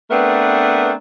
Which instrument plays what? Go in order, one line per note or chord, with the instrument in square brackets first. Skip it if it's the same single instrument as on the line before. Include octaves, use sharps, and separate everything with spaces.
[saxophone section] A3 B3 C4 D4 A#4 B4